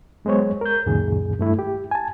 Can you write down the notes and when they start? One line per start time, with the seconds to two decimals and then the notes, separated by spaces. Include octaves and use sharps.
0.25 F#3 G#3 B3 C5 C#5
0.61 A#4 G6
0.86 C#2 F#2 A#2 D#3 G#4
1.39 G2 A3 E4
1.59 G4
1.91 G#5 A5